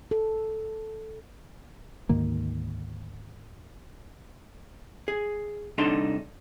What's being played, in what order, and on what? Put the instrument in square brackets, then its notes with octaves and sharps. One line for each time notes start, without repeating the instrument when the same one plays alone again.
[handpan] A4
[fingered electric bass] D2 G#2 D#3 A#3
[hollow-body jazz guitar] G#4
C2 D4 D#4 A4 A5 C6